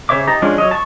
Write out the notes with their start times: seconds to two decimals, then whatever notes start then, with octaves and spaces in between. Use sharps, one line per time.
0.09 C#3 C5 C#5 E5 D6
0.27 D#4 G4 A5 A#5
0.42 F3 G#3 C#4 D4 F4
0.58 F#3 C#5 D#5
0.71 A5 C#6